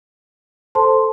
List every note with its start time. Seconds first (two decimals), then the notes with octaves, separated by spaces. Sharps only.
0.75 A4 C5 A5 C6